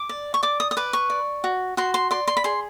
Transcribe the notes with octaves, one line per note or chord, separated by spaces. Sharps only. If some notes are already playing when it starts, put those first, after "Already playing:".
Already playing: D6
D5
C#6
D5 D6
D#6
D#6
B4 D6
C#6
D5
F#4
F#4 C6
C6
D5 C6
C6
B5
G#4 C6